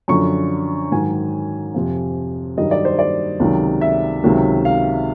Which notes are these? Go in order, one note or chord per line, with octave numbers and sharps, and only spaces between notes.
F#2 D3 F3 C#6
G#2 D#3 F#3 G#5
F2 C3 F3
G2 D#3 F#3 D#5
D5
C5
D5
C#2 C3 D#3 F#3
E5
C#2 C3 D#3 F#3
F5